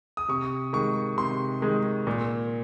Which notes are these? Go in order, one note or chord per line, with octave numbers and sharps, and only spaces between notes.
D#6
C3 C#6
D#3 G#3 C#6
C3 C6
D#3 G#3
A#2